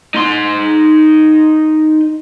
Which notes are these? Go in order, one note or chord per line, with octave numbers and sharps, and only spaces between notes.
D#4 C6